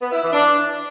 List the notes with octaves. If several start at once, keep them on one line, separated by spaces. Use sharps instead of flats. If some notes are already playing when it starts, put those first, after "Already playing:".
B3
E4
E3
D4